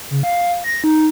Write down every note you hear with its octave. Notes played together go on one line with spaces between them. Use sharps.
C#3
F5
A#6
D#4